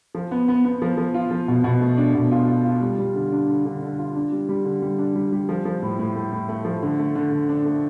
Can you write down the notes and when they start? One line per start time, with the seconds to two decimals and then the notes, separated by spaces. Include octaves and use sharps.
0.15 F3
0.31 B3
0.48 B3
0.65 B3
0.82 F3
0.97 F3
1.14 F4
1.31 F3
1.48 B2
1.64 B2
1.81 A3
1.97 D4
2.15 B2
2.31 F4
2.47 F4
2.64 F4
2.81 G3
2.98 G3
3.15 D3
3.32 D4
3.48 D3
3.65 D3
3.82 D3
3.99 F4
4.16 D4
4.32 G3
4.49 G3
4.65 D3
4.82 G3
4.98 D4
5.15 G3
5.32 G3
5.49 F3
5.65 F3
5.82 A2
5.99 A2
6.16 A2
6.32 A2
6.49 A3
6.65 F3
6.82 D3
6.99 A3
7.15 D3
7.32 D3
7.49 D4
7.65 A3